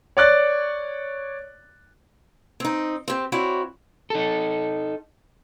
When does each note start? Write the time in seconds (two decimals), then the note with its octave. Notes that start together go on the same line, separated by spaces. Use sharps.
0.17 C#5 D5 F#6 A6
2.60 C4 D#4
3.08 C4 G4
3.32 C4 E4 F#4 C#5 D5
4.10 D#4 A4